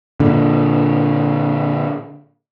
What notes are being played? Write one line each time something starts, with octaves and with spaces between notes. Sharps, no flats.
A#2 D3